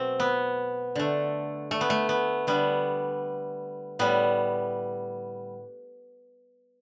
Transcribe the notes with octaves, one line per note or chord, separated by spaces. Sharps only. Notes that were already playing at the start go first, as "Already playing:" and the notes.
Already playing: B2 F#3 A3 C4
B3
D3 A3
A3
B3
A3
B3
D3 G3 B3
A2 G3 B3